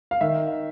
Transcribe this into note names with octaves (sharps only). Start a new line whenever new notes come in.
F5
D#3 E5